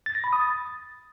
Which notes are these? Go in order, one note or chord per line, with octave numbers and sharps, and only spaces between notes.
A6
A#6
B5
D#6
A6